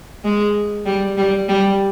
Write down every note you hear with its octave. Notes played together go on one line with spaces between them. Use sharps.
G#3
G3
G3
G3